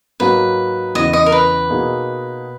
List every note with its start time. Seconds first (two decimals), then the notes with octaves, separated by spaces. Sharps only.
0.20 G#2 F#3 A#3 D#4 F#4 B4
0.95 E2 C#3 E3 D#5
1.13 D#5
1.26 A#4
1.32 B4
1.70 B2 A#3 D#4 G#4